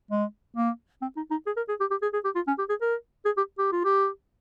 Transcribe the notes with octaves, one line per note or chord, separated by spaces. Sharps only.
G#3
A#3
C4
D#4
D#4
G#4
A#4
G#4
G4
G4
G#4
G#4
G4
F4
C#4
G4
G#4
A#4
G#4
G4
G4
F4
G4